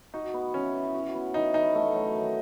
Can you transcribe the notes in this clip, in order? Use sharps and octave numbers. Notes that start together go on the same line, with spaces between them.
D#4 F#4
B3
E3 C#4
E3
F#4
B3
E3 D#4
E3 D#4
A3
F#3
D#3